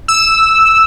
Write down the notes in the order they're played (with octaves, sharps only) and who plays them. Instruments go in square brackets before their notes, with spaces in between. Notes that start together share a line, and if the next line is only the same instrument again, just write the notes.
[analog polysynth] E6